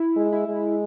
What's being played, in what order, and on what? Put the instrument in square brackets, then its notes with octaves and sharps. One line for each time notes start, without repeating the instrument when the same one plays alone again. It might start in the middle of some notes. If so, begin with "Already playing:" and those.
Already playing: [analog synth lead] E4
[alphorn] G#3
[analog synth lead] E4
[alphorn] G#3